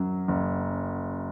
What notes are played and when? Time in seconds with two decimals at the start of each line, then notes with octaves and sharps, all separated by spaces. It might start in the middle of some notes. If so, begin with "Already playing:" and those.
Already playing: F#2 F#3
0.28 F#1